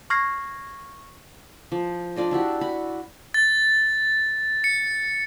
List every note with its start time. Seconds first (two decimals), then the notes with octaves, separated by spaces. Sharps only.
0.10 C#6 F6 G#6 A#6 C7
1.72 F3
2.16 D4 F4 D5 D#5
2.31 D4 E4 F#4 G4
2.61 F#4 B5
3.34 A6
4.64 C#7